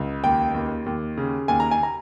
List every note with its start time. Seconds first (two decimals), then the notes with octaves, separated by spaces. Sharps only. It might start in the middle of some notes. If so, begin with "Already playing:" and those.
Already playing: C#2
0.24 D#2 G5
0.55 D#2
0.86 D#2
1.17 C#3
1.48 D#2 G#5
1.60 A#5
1.71 G#5
1.83 A#5